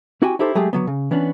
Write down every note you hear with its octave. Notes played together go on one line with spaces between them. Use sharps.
C4 E4 F#4 G4 G5 G#5
D#4 E4 G4 A4 C5
F#3 G#3 A3 G4 G#4
D3 F#3 B3
C#3
E3 B3 C#4 D4